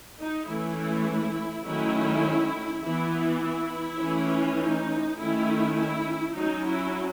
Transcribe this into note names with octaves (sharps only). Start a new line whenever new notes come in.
D#4
E3 A3 C#4 E4
D#3 F#3 A3 C#4 E4
E3 B3 E4
E4
E3 A3 C#4
D#4
D#3 A3 C#4 E4
E4
F#3 C#4 D#4
E4